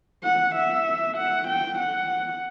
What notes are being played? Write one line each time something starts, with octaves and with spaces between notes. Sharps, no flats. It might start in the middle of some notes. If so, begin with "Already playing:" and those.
F#5
E5
F#5
G5
F#5